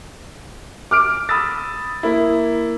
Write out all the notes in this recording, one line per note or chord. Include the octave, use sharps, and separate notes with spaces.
D6 F6 D7
B5 D#6 E6 A6
A#3 E4